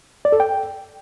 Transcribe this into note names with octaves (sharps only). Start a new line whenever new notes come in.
D5
A4
G5